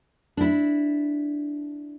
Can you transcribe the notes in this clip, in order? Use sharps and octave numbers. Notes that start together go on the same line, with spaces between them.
D4 E4